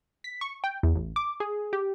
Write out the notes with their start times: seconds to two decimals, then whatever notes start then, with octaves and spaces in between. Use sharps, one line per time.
0.24 B6
0.41 C#6
0.64 G5
0.83 E2
0.95 A1
1.16 D6
1.40 G#4
1.73 G4